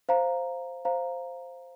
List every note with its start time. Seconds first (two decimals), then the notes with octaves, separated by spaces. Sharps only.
0.09 C5 F5 A#5
0.85 C5 F5 A#5